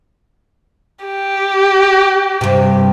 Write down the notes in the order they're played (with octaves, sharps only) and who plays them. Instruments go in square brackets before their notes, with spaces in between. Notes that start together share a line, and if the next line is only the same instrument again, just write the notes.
[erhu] G4
[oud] G2 C3